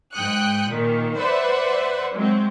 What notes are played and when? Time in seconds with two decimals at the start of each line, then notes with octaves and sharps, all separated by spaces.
0.13 G#2 G5 D#6 F#6 C#7
0.69 A#2 D#3
1.16 B4 C5 D5 E5 F#5
2.13 F#3 G#3 C4